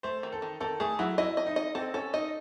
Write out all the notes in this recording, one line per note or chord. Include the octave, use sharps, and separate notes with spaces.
A3 C5
D#3
A4
D#3
D#3 A4
A3 G#4
F#3 E4
E4 D#5
D#5
D#4
D#5
C4 A4
C#4 A4
D#4 D#5